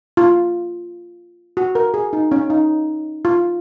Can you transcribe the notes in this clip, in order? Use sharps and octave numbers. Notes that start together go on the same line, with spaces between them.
F4
F#4
A#4
G#4
D#4
C#4
D#4
F4